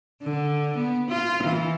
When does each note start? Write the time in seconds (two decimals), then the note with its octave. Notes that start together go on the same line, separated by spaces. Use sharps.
0.22 D3
0.75 B3
1.09 F4
1.42 E3